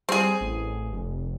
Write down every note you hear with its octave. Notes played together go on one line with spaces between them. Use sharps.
G3 C4 G#4
A1
F1